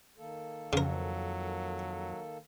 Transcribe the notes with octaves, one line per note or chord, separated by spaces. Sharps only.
D#3 A#3 A4
F2 C#3 F#3 A#4